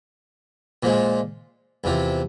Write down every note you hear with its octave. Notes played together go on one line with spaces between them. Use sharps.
A#2 F3 G#3
E2 C3 F3